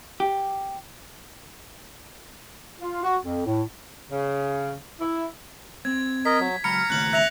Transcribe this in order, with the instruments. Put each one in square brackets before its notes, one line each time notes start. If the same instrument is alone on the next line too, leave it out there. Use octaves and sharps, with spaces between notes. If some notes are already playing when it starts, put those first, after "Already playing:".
[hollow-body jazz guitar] G4
[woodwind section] F4
F#4
F2
A2
[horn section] C#3
E4
[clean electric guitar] C4 [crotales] G#6
[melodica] A#4 D#5 [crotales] B6
[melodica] F#3
[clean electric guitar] C#2 F#3 B5 [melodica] A#5 [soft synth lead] F6 [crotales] C#7
[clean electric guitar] D#2 A2 C#3 [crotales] F#6 F#7
[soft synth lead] E5 [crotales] F#6 A#6 F7